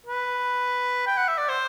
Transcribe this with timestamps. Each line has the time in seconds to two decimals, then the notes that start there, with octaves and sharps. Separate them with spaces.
0.06 B4
1.07 G5
1.17 F#5
1.28 E5
1.38 D5
1.49 C5